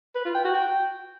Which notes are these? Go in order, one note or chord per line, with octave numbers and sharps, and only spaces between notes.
B4
F4
G5
F#4
G5